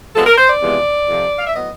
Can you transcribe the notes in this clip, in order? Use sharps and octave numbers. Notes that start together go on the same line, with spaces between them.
C3 F3 G#3 B3 A4
A#4
C5
D5
E2 C3 F3 G#3 B3
F2 C3 F3
F5
E5
A2 F#3 B3 D#5